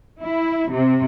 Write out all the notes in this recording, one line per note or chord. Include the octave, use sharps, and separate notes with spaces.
E4
C3